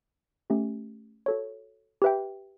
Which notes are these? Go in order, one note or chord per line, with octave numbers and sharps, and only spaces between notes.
A3 C#4 G4
F#4 A4 C#5
G4 B4 E5 G5